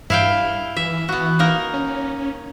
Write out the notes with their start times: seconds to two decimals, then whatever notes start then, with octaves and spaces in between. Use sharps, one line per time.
0.10 G2 E4 F5 G5
0.77 E3 E5
1.09 B3 F#4
1.39 A#3 D#4 A#4
1.74 C#4